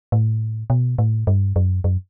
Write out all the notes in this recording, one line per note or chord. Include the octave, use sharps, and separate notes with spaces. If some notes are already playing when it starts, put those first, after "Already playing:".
A2
B2
A2
G2
F#2
F#2